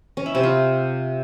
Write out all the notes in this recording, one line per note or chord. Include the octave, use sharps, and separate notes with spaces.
C#4
E4
C3
F4